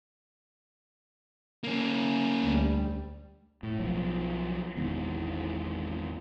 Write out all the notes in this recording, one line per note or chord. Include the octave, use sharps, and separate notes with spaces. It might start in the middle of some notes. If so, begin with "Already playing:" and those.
A#3 C#4
D2 G3
A2
B1 B2 F3 F#3
G#1 E2 G#2 B2